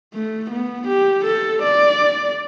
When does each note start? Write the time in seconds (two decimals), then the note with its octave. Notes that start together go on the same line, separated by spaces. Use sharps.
0.14 A3
0.51 B3
0.88 G4
1.25 A4
1.62 D5